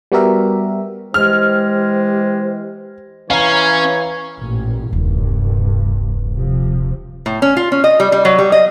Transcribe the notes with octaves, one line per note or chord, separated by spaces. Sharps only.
G3 B3 F#4 G4 A#4 E5
E3 G#3 G4 C5 F6
E3 C#4 C#5 F5 A#5
A1 A#2
D#1 C2 G2 D3
C3 F3
A2
C#4
F4
C#4
D#5
G3
G3
F#3
G3
D#5